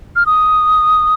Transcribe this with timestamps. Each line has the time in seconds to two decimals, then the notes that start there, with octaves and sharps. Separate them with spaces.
0.16 F6
0.26 D#6